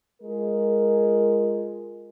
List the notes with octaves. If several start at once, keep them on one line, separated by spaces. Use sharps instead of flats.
G#3 F4 A#4